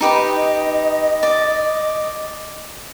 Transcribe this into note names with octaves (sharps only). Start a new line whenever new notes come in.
D#4 G4 B4 D#5
D5